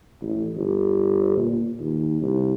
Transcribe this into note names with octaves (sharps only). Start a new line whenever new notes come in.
A1
G1
A#2
D#2
C2